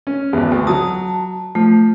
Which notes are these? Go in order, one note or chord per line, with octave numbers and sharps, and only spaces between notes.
C#4
G#1 E2
D2
F#3 A5 D#6
F3 A3